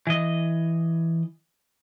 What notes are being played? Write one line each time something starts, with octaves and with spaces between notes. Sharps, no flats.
E3 D#5